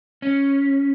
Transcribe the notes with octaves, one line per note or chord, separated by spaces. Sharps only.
C#4